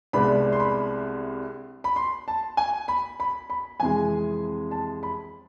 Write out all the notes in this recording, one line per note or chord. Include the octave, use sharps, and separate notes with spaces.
C2 C3 G#3 B3 D4 B5
C6
B5
B5
C6
A5
G#5
B5
B5
B5
F2 C3 E3 G#3 G#5
A5
B5